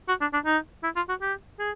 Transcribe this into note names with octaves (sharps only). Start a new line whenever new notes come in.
F#4
D4
D4
D#4
E4
F4
F#4
G4
G#4